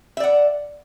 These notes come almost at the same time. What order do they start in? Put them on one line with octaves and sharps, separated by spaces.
E5 D5 F#5